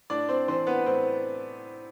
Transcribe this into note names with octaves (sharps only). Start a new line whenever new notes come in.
A2 D4 D5
C4 C5
E3 C4 C5
B3 B4
A2 C4 C5